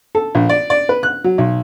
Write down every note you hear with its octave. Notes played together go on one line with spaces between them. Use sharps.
A4
A#1
D5
D5
B4
F#6
F#3
B1